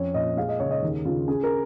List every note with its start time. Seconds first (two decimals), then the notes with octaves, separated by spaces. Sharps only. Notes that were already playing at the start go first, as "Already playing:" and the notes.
Already playing: F2 C#4 C#5
0.14 A#2 D#5
0.37 G#3 F5
0.49 D#5
0.60 C#3 C#5
0.71 D#5
0.82 D#2
1.05 C#3 F4
1.28 C#4 G#4
1.43 A#4